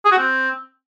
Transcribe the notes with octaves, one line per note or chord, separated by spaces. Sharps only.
G#4
F#4
C4